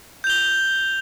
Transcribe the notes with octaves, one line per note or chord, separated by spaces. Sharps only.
G6 F7 G7